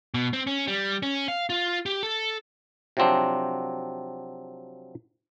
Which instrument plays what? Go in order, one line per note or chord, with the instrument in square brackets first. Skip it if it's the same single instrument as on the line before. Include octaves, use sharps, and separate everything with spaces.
[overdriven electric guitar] B2
C4
C#4
G3
C#4
F5
F4
G4
A4
[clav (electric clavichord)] C3 F3 F#3 C4 D4